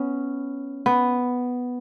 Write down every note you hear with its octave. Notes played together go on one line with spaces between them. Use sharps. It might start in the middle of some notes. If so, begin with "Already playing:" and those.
Already playing: B3 C#4
B3